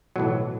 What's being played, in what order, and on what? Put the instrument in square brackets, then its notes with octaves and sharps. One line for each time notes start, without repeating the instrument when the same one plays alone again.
[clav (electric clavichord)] B1 A2 E3 F#3